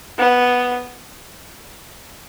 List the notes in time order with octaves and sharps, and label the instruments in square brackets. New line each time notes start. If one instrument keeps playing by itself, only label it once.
[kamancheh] B3